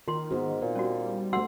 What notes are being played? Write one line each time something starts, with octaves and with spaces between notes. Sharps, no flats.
D#3 F4 A#4 C6
G#2 B3 D#4 F#4
A#2 C5
G3 C#4 F#4
D2 A3 F#4 F#5 C6 E6